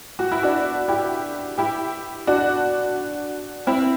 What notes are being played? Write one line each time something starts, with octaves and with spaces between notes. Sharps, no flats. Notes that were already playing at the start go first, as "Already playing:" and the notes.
F#4
E4
D4 F#4
E4 G4
E4 G4
D4 F#4
C4 E4